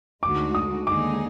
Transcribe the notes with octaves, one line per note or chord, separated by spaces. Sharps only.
D2 D3 G#3 D#4 F#4 D6
D#6
D#2 D3 G#3 D#4 G#4 D6